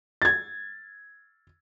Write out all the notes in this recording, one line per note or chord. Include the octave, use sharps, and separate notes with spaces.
G#6 A6